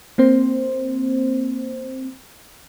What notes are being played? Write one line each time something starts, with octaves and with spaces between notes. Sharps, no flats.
A#3 C4 C5